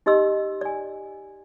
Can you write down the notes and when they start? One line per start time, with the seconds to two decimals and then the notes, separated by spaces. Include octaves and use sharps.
0.06 D#4 G4 D#5 C6 E6
0.61 D5 G#5